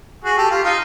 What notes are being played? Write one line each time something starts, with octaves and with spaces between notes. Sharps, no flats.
F#4 G#4
G4 A4
F4 G4
D#4 F4